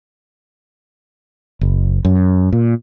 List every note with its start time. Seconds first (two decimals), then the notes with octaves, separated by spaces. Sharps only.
1.61 F#1
2.05 F#2
2.53 A#2